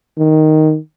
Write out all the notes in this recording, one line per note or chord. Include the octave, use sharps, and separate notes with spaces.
D#3